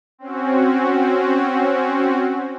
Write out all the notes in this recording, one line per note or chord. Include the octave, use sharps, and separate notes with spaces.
C4 C#4 F#4